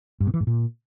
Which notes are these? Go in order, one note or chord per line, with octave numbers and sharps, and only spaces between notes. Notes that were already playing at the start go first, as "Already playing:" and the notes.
G2
B2
E3
G#2
A#2